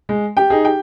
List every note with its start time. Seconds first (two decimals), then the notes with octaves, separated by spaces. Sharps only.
0.09 G#3
0.37 G4 G5
0.50 D#4 G#4
0.65 G4 G5